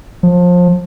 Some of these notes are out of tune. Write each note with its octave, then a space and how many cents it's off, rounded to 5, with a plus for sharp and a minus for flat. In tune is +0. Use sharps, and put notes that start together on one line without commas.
F3 +25